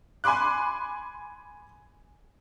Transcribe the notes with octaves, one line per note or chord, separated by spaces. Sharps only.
G#5 B5 C6 D6 F#6